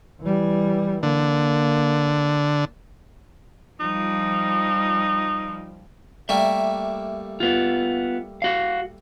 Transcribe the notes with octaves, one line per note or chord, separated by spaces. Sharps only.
E3 G3
D3 A#3
F3 G3 D#4
G3 A3 A#3 E5
B3 F4
F#4 F5